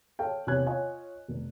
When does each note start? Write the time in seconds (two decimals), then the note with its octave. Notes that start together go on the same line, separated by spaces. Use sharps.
0.19 A4 C#5 F5 G5
0.47 E2 C3 C#5 G#5 F#6 G#6
0.66 F4 C#5 D#5 G#5
1.28 F1